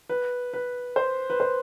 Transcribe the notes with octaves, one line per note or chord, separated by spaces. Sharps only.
B4
B4
C5
B4
C5